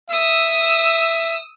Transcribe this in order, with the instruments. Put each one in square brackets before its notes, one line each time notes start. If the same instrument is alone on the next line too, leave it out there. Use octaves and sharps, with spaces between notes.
[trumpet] E5 [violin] D#6 E6